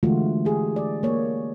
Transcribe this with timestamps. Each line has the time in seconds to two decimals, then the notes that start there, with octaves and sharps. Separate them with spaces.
0.03 D3 E3 G#3 A3 F4 F#4
0.45 G4 G#4
0.76 D5
1.03 A#3 C#5